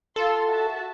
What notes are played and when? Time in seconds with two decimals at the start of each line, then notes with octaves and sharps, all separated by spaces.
0.16 F4 A4 C6
0.48 F#4 E5 A5